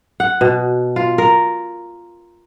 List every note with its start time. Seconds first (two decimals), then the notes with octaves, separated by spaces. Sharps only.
0.20 F#5
0.41 B2
0.96 F4
1.18 A#4